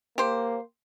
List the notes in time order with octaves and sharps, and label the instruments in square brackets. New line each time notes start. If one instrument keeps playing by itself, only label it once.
[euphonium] A#3 [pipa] G4 C5